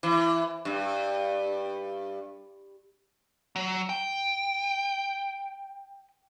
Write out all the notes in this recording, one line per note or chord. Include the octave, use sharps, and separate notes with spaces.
E3
G2
F#3
G5